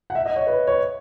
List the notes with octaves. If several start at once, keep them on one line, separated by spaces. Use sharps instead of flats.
F#5
E5
D#5
C#5
B4
C#5